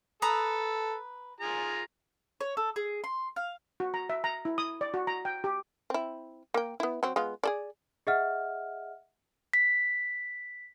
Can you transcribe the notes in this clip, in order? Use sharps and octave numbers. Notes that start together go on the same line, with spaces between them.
A4 B4 A#5 D#6
F4 G#4 A#5
C#5
A4
G#4
C6
F5
F#4
A#5
E5
A#5
E4
D#6
D5
F#4
A#5
G5
G4
C4 E4
A#3 G5
B3 E4
F#3 C4
G#3 B3 F4
G#4 A4 D5
G#4 D#5 E5 F#5 F6
B6